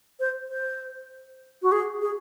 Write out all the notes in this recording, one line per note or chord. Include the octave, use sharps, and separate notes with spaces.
C5
C5
F#4
G#4
G#4